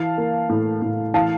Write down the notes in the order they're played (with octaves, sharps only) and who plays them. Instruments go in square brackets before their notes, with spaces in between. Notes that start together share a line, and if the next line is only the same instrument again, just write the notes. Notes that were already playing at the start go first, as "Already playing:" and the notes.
Already playing: [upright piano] E3 F5 A5
A#3
A2
A2
E3 F5 A5